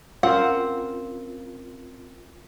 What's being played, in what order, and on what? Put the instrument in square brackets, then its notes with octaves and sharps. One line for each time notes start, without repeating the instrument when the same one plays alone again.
[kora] C4 [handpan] C#4 A#4 F5 [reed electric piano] F4 [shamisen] F#5